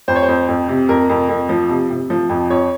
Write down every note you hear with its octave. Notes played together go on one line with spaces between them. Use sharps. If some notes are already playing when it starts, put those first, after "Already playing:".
F2 C5
C#5
C5
F2
F2
C3
F2 A#4
F2
F2
F3
C3
C3
F3
F2
F2 C#5